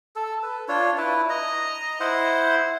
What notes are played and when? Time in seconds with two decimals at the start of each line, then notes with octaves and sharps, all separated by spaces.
0.16 A4
0.43 B4
0.68 D4 F4 C#5
0.98 E4 B4
1.29 D#5 A#5
2.00 E4 C5 F#5